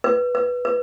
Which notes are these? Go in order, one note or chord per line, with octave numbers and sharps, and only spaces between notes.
B4
B4
B4